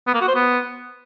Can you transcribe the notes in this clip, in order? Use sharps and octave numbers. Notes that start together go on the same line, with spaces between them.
B3
A#3
F#4
C5
B3